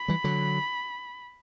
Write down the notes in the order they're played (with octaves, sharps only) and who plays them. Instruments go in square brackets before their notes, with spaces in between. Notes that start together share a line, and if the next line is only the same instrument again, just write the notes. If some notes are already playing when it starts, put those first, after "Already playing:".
Already playing: [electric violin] B5
[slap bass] E3 G3
D3 F#3